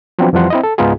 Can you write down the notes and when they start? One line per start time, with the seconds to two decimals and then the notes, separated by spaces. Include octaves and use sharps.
0.19 F3 F#3 B3 C4 D4 F#4
0.33 F2 E3 F3 G3 F#5 C6
0.50 C4 E4 D#5
0.63 A4
0.78 C#2 G#2 B3 D#4 F4 G#4